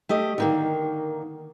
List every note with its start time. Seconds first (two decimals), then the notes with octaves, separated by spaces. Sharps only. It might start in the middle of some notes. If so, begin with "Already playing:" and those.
0.09 A3 G4 D#5
0.38 D3 D#3 A#3